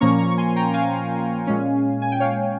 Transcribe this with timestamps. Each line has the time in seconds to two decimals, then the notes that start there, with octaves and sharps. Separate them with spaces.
0.01 A#2 F3 A#3 C#4 A#5 C#6
0.19 A#5 C#6
0.31 C#6
0.37 G#5 C6
0.56 G5 A#5
0.74 F5 G#5
1.47 A#2 G#3 C#4
2.02 G#5
2.12 G5
2.20 C#5 F5